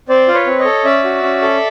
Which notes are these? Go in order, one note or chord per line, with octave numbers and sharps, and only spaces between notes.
C4 C5 D5
F4
B4 C#5
C4
C#5 D#5
A4
C#4 D5 E5
F#4
C#4
A4